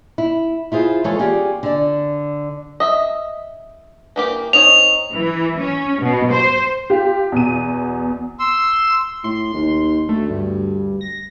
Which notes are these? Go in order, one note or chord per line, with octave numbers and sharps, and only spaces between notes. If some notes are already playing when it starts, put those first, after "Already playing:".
E4
E4 F4 G#4 C5
E3 G#3 F4 A4 C#5
C#4 F4 G4 G#4 D5
D3 D5
D#5 E5
E3 A#3 G4
C4 D#4 C#5 F7
E3
C#4
B2
C5
F4 G4
E2 B2 D#7
C6 E6
A2 C6
D#2
D2 A3
G2
A#6